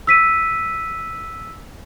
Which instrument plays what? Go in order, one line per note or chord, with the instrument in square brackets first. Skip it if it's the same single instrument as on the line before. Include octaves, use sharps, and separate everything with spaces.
[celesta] E6 B6 D#7